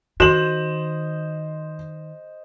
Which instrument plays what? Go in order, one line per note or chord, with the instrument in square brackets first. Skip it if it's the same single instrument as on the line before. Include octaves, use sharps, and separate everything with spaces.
[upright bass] D#3 [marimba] F#4 [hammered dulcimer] C5 D#5 [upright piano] E7 F#7